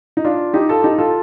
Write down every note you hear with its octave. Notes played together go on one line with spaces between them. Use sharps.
D#4
D4 F4
D#4 G4
F4 A4
D#4 G4
F4 A4